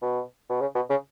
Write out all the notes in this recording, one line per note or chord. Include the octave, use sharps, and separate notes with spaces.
B2
B2
C#3
B2
C#3